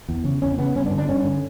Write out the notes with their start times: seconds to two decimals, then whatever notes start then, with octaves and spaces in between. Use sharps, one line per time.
0.09 E2
0.25 C#3
0.42 E2 C#4
0.58 C#3 B3
0.75 G2 C#4
0.86 D4
0.91 D3
0.98 D4
1.08 G2 C#4
1.25 D3